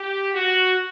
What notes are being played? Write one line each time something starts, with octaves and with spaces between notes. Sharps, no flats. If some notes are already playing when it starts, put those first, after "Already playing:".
Already playing: G4
F#4